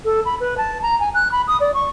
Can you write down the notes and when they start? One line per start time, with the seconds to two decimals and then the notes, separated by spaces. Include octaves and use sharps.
0.05 A4
0.25 B5
0.40 B4
0.58 A5
0.82 A#5
1.00 G#5
1.15 F#6
1.32 B5
1.48 D#6
1.60 D5
1.74 C#6